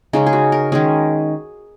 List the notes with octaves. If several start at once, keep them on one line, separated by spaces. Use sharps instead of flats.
C#3 G#3 C#4 D#4
G#4
F#4
A#4
D#3 G#3 C#4 G#4